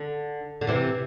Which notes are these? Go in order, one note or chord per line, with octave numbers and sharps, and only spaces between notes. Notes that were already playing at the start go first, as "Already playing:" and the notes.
Already playing: D3
D3
C3 E3